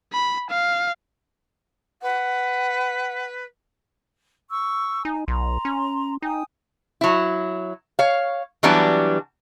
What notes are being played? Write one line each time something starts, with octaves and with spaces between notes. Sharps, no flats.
B5
F5
B4 F#5
C#6 E6
D#4 G#5
B1 A#5 C6
C#4
D#4 G5 G#5 D#6
F#3 E4
C#5 F5
E3 F#3 G3 B3 D4